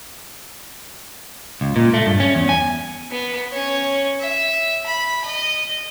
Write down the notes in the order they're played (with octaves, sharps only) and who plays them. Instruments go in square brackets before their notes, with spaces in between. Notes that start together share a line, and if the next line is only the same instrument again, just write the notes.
[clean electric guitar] C#2
A#2
A3
G2
C#4
E2
G#5
[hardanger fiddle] B3
C#4 C#5
E5
B5
D#5